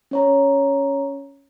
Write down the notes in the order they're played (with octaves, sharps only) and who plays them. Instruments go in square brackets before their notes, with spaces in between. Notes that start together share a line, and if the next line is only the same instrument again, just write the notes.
[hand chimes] C#4 C#5 A#5